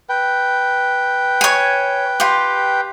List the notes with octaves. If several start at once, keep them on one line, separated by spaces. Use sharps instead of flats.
B4 G5
C#5 G#5
F4 G4